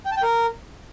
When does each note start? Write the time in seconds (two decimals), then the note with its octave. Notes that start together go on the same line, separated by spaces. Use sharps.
0.06 G5
0.11 A5
0.17 G5
0.23 A#4